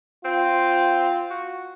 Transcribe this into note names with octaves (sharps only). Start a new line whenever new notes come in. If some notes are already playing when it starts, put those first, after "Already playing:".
C4 F4
F#4